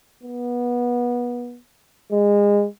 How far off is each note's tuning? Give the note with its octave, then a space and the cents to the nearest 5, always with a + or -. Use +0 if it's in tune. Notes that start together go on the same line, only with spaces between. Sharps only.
B3 -25
G#3 -25